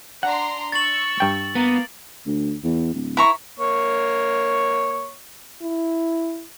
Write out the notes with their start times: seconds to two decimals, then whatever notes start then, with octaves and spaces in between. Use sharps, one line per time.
0.23 D4 F#5 A#5 C6
0.72 C#6 E6 A6 F#7
1.20 G2 G5
1.55 A#3 B3
2.26 D2
2.64 E2
2.93 D1
3.17 E4 A#5 C#6
3.59 A#3 C#5 C#6
5.62 E4